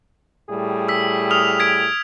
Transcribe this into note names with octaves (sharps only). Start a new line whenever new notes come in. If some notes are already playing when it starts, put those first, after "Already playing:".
A2 G3 G#4
E6 B6
D#6 F6 F7
G#6 B6 D7